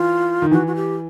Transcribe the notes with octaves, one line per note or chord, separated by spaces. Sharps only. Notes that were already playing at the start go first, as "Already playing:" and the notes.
Already playing: E3 F4
D#3
E3 F#4
F#4
G4